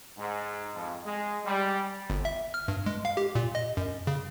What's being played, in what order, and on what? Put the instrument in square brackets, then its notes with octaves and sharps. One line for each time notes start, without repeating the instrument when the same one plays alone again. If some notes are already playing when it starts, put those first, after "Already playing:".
[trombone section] G#2
F2
G#3
G3
[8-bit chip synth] G1
E5
F6
G2
G#3
F5
G4
A#2
D#5
F#2
C#3